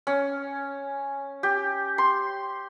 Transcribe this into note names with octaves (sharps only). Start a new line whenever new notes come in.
C#4
G4
C6